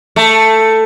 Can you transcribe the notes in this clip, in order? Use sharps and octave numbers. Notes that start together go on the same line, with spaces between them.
A3